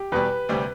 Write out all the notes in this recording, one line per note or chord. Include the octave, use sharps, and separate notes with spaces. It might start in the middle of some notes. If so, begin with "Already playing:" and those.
Already playing: G4
E2 B2 G3 B4
D2 C3 G3 C4